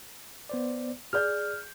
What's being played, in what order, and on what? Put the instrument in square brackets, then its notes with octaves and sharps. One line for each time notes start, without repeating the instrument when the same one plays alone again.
[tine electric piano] B3 C5 D5
[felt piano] G#4 D5 G6 [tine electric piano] F6